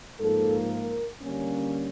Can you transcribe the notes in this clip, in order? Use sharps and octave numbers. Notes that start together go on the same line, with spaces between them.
G#2 F3 A#3 A4
A#4
D3 G3 A#3 C#4